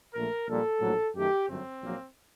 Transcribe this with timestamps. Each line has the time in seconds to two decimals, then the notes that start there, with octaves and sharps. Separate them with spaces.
0.14 A#1 A#2 A3 A#4
0.47 A#1 A#2 G3 A4
0.81 A#1 A2 F#3
1.14 F#2 D#3 A3 G4
1.48 G1 F#2 F#3 A3 C4
1.82 A#1 A#2 F#3 A#3